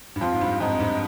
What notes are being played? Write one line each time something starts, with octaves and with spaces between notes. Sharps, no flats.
G2
F2 F4
G#2
G2
F2 G#2 D#4
G2